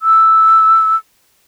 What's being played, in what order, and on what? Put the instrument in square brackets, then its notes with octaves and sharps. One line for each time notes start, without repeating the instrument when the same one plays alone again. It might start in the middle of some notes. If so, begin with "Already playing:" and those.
[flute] E6